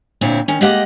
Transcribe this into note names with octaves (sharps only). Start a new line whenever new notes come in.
D2 A#2 C4 E4 C#5
D#3 C#4
G#3 A#3 G4 D#5 F#5